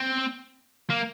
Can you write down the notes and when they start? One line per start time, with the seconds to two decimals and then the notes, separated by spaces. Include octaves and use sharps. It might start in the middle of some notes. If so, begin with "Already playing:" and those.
Already playing: C4
0.90 A#3